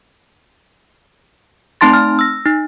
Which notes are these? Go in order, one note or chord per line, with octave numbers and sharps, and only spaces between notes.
A3 C4 D#4 A5 C6 A6
F6
E6 A#6
D#4